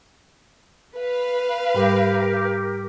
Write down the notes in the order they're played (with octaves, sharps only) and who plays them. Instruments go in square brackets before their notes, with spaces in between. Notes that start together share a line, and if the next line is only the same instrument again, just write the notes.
[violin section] B4 F5
[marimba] G#2 G3 [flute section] G4 A#4